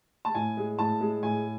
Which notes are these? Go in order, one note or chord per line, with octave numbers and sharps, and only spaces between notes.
A5
A2 G#5
G#3
A2 A5
G#3
A2 G#5